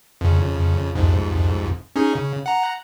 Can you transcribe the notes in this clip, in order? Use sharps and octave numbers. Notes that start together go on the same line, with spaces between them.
F2 C#3
C2 F2 G#2
C#4 D#4 G#4
C#3
F#5 A#5